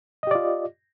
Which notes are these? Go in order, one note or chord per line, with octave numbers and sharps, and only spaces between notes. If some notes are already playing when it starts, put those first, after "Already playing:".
F4 G4 D5 D#5